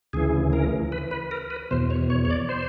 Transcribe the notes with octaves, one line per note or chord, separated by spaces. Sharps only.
D2 C#3 E3 G#4
A#4
B4
B4
A#4
B4
E2 B2 C5
C#5
C#5
C#5
D5
C5